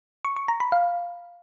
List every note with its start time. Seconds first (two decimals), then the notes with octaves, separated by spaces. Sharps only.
0.25 C#6
0.36 C#6
0.48 A#5
0.60 B5
0.72 F5